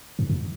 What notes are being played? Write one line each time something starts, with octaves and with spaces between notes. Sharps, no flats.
G2
F#2